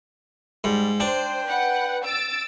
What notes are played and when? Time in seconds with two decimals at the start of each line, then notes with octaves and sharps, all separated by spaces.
0.64 G#2 G3
1.00 D4 C5 G5
1.47 B4 F#5
2.04 E6 A6 D7